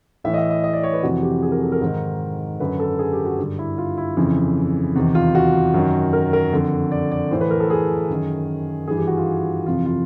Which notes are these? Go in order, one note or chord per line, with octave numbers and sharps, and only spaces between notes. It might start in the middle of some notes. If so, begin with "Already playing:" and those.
A2 E3 E5
D#5
E5
D#5
D#5
D5
C#5
B4
F2 C3 E3 F#4
G4
G#4
A#4
A4
A#4
G#2 D#3
F#2 D3 B4
A4
G#4
G4
F#4
G2 D3
E4
F4
E4
F2 C#3 E3
E2 C3 D#3
F4
F#4
F#2 D#3
A#4
A#4
F2 D3
D5
D5
A2 E3 C5
B4
A#4
A4
G#4
F#2 D#3
G2 E3 G#4
G4
F#4
F4
F2 C3 E3 F4
F4